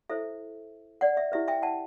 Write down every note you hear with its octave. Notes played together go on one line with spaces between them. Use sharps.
E4 A4 C5 E5
D5 F#5
E5
E4 G4 B4 E5
E5 G5
F#5 A5